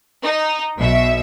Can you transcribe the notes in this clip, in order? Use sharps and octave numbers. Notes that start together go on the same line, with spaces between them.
D#4
B1 B2 E5